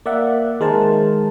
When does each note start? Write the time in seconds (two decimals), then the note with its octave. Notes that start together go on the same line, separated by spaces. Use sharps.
0.05 A#3 D5 E5 F#5
0.60 D#3 G#3 A#4 C5 A5